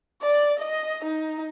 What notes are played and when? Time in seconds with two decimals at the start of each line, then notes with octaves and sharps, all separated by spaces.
0.22 D5
0.59 D#5
1.04 D#4